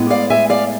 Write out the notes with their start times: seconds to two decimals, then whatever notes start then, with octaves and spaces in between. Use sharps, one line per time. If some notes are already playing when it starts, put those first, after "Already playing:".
Already playing: A2 G#3 B3
0.10 D5 F5
0.30 E5 G#5
0.50 D5 F5